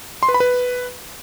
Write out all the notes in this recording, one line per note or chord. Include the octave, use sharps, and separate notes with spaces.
C6
B4
B5
B4